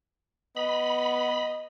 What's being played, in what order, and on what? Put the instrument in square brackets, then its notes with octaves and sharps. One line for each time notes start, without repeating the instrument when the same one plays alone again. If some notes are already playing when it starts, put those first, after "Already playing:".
[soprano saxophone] B3 [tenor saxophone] D#5 [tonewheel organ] B5